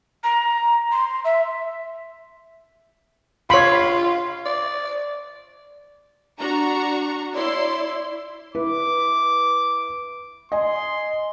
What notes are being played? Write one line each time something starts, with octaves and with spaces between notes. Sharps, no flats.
A#5
C6
E5
F4 C#5 B5 C6
D5
D4 F#4 A#5 C#6
E4 C#5 D5 C6
E4 B4 D6
D#5 G#5 C6